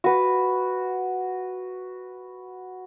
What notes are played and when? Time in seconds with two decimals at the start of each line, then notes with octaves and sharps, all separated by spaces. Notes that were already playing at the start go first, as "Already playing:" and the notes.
0.04 F#4 B4